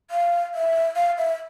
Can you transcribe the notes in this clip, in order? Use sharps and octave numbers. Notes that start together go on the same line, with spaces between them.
F5
E5
F5
E5